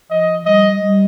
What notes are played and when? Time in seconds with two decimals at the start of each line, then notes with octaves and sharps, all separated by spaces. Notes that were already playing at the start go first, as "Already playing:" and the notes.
0.10 F3 D#5
0.45 G3 D#5
0.81 G3